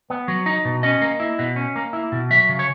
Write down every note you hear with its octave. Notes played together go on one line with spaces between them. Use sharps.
B3
F#3
D#4
B2
C#4 D#5
A#3
E4
B2
C#4
A#3
E4
B2
F#3 E5
C#3
C#5